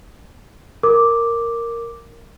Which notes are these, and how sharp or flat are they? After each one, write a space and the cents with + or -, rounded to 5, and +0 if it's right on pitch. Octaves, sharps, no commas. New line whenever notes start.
A#4 -5 D6 +0